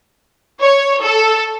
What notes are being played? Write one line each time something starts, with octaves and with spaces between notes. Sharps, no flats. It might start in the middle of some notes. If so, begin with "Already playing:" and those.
C#5
A4